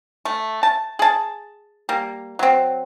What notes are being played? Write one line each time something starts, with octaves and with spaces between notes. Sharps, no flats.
A3
A5
G#4 A5
G3 A#3
F#3 C4